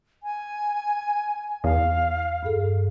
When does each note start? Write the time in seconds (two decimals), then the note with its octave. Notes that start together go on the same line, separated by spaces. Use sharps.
0.23 G#5
1.64 E2 F5
2.43 G2 G#4 A4